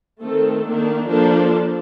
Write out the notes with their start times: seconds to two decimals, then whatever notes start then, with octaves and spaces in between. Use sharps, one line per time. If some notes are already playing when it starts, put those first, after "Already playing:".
0.21 D#3 A3 C4 A4
0.66 D#3 A#3 D4
1.09 F3 A#3 D4 A4